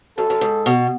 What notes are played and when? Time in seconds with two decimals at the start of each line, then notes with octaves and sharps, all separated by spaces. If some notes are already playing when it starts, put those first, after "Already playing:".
0.18 F#2 A4
0.30 F#2
0.41 G#2
0.66 B2